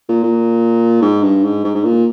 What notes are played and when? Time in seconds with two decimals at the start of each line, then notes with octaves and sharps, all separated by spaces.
0.09 A#2
0.23 A#2
1.02 G#2
1.22 G2
1.43 G#2
1.64 G#2
1.75 G#2
1.84 A#2